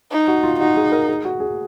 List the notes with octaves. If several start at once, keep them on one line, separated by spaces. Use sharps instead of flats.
D#4
F#4
F4
D#4 F#4
G#4
A#4
G#4
F#4
G#4